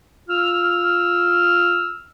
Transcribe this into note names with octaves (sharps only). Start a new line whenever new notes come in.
F4 E6 F6